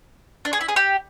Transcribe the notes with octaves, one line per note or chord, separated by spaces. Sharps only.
D4
G#4
E4
G#4
G4